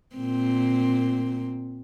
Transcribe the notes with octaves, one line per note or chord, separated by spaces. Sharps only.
A#2 C4